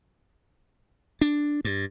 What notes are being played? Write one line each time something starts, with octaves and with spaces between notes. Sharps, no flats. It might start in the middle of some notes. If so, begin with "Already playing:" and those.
D4
G2